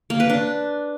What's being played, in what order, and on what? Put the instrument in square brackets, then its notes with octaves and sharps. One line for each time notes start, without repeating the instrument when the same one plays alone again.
[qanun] A#3
B4
D4